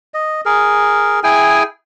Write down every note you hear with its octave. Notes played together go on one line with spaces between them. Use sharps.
D#5
G#4 A#4
E4 G#4 G5 G#5